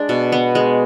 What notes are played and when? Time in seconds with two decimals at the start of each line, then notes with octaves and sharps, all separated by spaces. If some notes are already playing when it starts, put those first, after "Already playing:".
Already playing: G#3 D4
0.09 B2
0.32 B3
0.55 G#3